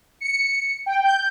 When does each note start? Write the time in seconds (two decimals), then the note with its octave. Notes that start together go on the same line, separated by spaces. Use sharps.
0.21 C#7
0.86 G5
1.04 G6